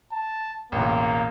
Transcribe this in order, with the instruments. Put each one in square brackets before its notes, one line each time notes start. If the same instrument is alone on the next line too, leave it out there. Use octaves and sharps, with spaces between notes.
[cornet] A5
[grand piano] E1 A1 [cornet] A#3